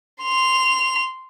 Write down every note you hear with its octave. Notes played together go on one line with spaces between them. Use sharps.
C6 F7